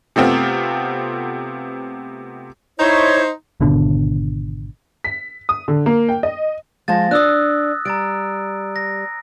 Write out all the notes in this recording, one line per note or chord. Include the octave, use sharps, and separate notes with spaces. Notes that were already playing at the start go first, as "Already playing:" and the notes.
C3 A3 B3 C4 F4
D#4 E4 C5 C#5 C#6
G#1 B2 D3
B6
D#6
D3
A#3
G5
D#5
F3 G#3 A5 A6 A#6
D4 D5 D#6 E6 F#6
G3 A#5 A6 D7
A#6